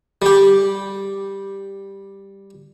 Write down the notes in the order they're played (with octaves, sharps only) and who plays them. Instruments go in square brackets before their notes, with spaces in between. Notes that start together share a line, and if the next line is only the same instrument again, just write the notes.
[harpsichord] G3 G4